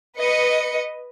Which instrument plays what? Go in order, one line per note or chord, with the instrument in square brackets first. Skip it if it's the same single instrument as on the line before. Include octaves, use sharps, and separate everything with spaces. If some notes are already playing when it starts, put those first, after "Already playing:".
[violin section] B4 D#5 C#7